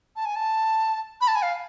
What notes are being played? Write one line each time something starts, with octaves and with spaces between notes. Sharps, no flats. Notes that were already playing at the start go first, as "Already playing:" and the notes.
A5
G#5
A5
B5
A5
G#5
F5